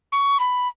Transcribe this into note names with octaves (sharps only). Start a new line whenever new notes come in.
C#6
B5